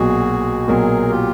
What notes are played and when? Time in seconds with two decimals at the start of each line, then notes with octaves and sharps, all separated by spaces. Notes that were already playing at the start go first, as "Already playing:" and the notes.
Already playing: B1 A#2 F#3 F#4 G#4
0.67 B1 A#2 F#3 G#4 A#4
1.09 F4 G4